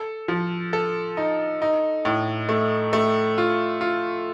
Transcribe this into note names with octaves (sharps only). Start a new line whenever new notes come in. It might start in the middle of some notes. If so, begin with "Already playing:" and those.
Already playing: A4
F3
A4
D#4
D#4
A2
A3
A3
F4
F4